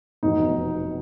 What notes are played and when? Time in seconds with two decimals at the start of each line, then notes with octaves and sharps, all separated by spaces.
0.23 F1 E2 B2 D#4